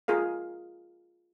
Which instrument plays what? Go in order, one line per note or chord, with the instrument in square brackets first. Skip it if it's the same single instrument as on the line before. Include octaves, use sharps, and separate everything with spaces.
[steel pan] F4 G#4 A#4 F5